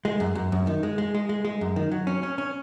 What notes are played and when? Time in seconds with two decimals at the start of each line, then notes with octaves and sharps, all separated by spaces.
0.05 G#3
0.20 F#2
0.35 F#2
0.52 F#2
0.67 D#3
0.83 G#3
0.98 G#3
1.15 G#3
1.29 G#3
1.45 G#3
1.61 F#2
1.76 D#3
1.92 F#3
2.07 C#4
2.23 C#4
2.38 C#4